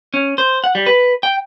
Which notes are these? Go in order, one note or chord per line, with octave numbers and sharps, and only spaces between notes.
C#4
C5
F#5
G3
B4
G5